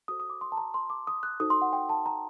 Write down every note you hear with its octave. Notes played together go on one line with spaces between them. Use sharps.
F#4 A4 C5 D#6
D#6
D6
C6
A5
A#5
C6
D6
D#6
F#6
D#4 F#4 A4 C5 D#6
C6
F#5
G5
A5
A#5